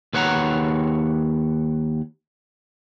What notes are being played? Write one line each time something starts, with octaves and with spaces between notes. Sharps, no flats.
D#2 B4 C#5 F#5 A#5